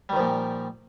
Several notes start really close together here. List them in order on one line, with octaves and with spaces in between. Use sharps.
G3 D#3 F3 A#2